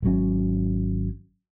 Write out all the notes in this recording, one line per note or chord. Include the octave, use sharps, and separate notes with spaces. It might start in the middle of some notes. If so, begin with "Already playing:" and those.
G#1 G#2 F#3 C#4